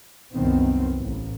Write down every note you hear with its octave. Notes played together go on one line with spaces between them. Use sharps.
C2 F#2 D#3 B3 C4
A1